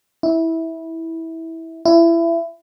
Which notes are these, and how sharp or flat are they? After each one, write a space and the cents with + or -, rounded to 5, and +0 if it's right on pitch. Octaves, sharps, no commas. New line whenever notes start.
E4 -15
E4 +25